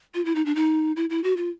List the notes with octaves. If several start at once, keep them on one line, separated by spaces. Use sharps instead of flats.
F4
E4
D#4
D4
D#4
E4
E4
F#4
F4